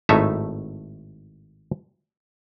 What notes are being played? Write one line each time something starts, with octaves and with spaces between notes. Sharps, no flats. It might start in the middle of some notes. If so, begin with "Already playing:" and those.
G#1 A2 A3 D#4 C#5 E5